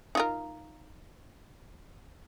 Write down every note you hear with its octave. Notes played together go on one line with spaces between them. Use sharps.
D#4 F4 A#4